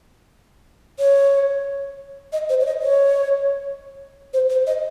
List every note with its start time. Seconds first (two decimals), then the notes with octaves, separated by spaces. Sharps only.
0.99 C#5
2.32 D#5
2.49 C5
2.60 C#5
2.66 D#5
2.82 C#5
4.33 C5
4.49 C5
4.66 D#5